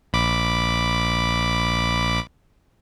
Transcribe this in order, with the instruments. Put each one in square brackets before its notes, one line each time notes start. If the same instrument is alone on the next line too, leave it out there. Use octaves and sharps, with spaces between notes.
[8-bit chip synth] A#1 B5 D6